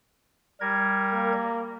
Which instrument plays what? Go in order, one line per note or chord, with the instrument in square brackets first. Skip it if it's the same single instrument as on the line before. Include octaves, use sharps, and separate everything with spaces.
[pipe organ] G3 A#4 G#6
[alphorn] A#3